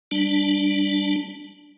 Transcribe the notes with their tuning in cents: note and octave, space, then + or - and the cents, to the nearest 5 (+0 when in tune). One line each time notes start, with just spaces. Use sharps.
G3 +0 D4 +0